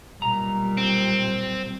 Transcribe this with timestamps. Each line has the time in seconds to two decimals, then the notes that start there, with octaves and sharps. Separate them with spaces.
0.20 B1 A#2 G3 A#5
0.77 C4